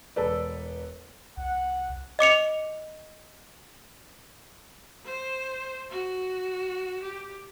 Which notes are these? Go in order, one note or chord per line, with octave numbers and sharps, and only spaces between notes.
E1 A4 B4 D5
C2 F#5
D#5 D6 C#7 F7
C5
F#4
G4